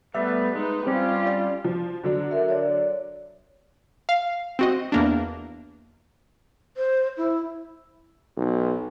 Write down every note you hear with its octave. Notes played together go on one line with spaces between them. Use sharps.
G3 A3 B3 B4 E5
G#3 D#4 B4
G3 C4 C#4 F4 G4
D5
F3
D3 F#3 D4
A#4 E5
C#5 D5
F5
C4 F#4 D#5
E2 A#3 D4
C5
E4
B1